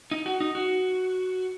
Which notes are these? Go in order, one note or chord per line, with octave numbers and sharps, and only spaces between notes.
D#4
F#4
D#4
F#4